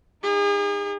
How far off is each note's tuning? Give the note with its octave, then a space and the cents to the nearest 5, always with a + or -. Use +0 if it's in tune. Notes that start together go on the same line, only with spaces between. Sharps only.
D#4 -5 G#4 -40